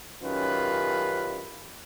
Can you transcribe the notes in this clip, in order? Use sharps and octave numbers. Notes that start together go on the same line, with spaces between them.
F#2 D#3 C#4 F4 G4 B4